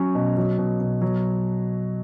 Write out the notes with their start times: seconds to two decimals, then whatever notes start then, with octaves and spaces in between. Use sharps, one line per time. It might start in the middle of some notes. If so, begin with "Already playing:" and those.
Already playing: F#3 C#4
0.15 B2
0.37 F#3
0.58 B2
0.80 B2
1.02 F#3